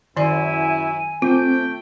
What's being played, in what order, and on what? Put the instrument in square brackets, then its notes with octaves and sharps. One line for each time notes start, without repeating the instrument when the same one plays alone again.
[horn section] F#2 E4 [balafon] D#3 D5 [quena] G#5
[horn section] A3 G5 [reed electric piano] C4 [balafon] F4